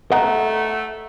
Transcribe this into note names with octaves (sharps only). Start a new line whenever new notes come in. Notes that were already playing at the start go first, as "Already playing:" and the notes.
A3 D#5 F#5 A#5